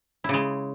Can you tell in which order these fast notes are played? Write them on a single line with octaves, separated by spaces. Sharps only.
E4 C#3 G#3